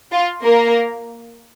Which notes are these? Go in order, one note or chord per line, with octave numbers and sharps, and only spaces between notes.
F4
A#3 A#4